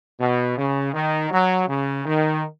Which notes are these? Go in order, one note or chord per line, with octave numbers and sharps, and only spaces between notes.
B2
C#3
D#3
F#3
C#3
D#3